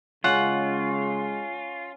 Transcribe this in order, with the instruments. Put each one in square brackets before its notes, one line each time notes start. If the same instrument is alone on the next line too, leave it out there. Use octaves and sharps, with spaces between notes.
[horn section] C#3 G#3 [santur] C#4 [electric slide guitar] F4 [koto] F#5